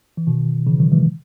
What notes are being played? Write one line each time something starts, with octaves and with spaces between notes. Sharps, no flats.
E3
B2 D#3
C#3 E3
D#3 F#3
E3 G#3